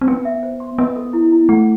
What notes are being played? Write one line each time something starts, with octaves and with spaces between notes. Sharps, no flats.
C4
B3 G5
E5
C5
C6
B3 D#5
A4
E4
E4
A3 F#5